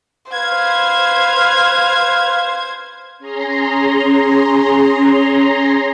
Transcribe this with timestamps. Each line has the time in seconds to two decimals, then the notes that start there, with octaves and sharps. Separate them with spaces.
0.32 B4 C5 F5 G#6
3.18 C#4 G#4 A#5 C6